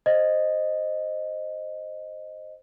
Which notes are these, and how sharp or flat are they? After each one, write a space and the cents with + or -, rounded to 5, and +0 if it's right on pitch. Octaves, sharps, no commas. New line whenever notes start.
C5 +0 D#5 -5